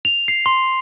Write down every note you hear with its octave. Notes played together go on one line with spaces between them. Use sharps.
F7
C7
C6